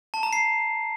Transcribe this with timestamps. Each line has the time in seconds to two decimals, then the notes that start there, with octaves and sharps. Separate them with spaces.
0.14 A5
0.23 A#5
0.33 C7